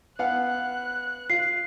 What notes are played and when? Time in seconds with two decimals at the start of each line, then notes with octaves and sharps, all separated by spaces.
0.19 B3 F5 F#5 F#6
1.30 F4 C7